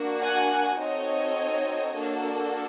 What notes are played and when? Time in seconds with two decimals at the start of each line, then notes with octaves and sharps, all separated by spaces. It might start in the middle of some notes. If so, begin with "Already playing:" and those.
Already playing: A#3 D4 F#4
0.21 F#5 G#5
0.78 C4 D#4 F#4 A4 C#5 D#5
1.93 A#3 D4 F#4 A4